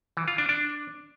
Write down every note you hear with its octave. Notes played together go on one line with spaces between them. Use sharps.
E3
F4
D4
D4